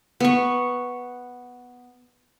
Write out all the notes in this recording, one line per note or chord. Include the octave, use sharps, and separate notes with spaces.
B3 C#6